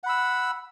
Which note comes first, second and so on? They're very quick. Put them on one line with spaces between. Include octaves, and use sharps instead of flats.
F#5 B5 E6